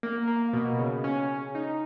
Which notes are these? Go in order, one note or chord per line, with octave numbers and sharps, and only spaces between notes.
A#3
A#3
B2
C#3
C#4
C#4
D#4